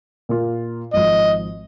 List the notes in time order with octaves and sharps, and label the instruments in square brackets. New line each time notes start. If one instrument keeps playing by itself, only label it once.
[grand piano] A#2 A#3 F4
[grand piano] G#1 G#2 F3 [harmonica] D#5